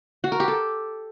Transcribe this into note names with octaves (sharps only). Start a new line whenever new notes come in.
F#4
A#4
G4
A4